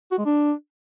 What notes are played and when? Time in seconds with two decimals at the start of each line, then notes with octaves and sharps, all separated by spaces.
0.11 F#4
0.18 G#3
0.25 D4